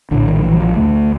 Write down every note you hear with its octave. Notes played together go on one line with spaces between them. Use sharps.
A#1 A2 D3
D#3
F3
E3
F#3
F3
D2 D3 A3